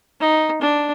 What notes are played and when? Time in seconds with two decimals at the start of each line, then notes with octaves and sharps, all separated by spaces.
0.20 D#4
0.61 D4